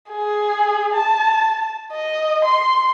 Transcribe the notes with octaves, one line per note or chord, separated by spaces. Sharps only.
G#4
A5
D#5
C6